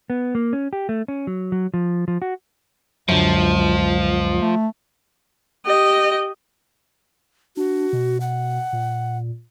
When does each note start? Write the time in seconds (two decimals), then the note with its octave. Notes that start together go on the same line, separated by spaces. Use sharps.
0.10 B3
0.35 A#3
0.53 C#4
0.73 G4
0.89 A3
1.08 C#4
1.27 F#3
1.52 F#3
1.74 F3
2.08 F3
2.22 F#4
3.09 C#2 F#2 D3 F3
4.41 A3
5.66 G4 D#5
7.57 D4 F#4
7.93 B2
8.21 F#5
8.73 A#2